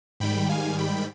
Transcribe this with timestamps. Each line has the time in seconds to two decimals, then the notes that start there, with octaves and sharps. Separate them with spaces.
0.20 G#2 D#3 G3 G5 B5
0.49 F5 G#5
0.79 G5 B5